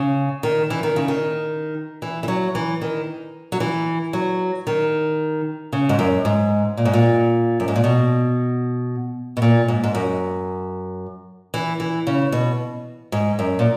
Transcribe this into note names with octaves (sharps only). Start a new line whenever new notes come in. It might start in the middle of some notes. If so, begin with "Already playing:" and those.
Already playing: C#3
D#3
E3
D#3
C#3
D#3
E3
E3
F#3
E3
D#3
F#3
E3
F#3
D#3
C#3
G#2
F#2
G#2
A#2
G#2
A#2
F#2
G#2
A#2
B2
B2
A#2
G#2
G#2
F#2
E3
E3
C#3
B2
G#2
F#2
A#2